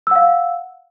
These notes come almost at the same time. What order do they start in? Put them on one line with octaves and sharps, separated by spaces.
E6 F#5 F5